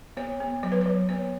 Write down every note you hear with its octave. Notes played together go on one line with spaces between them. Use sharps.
B3 C#5
B3
F#3 C#5
B4
F#3 C#5
B3 C#5